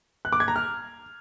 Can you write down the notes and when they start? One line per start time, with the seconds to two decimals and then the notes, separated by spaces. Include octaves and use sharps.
0.25 F#6
0.33 D6
0.40 G#6
0.48 A#5
0.56 F6